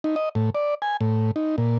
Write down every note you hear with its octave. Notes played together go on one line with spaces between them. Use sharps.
D#4
D#5
A2
D5
G#5
A2
D#4
A#2